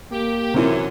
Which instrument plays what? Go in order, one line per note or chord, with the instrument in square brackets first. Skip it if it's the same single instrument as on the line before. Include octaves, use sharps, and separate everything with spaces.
[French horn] A#3 [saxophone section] G4
[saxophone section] F#2 [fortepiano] C3 E3 E4